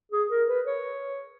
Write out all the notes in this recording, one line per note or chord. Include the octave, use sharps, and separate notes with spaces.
G#4
A#4
B4
C#5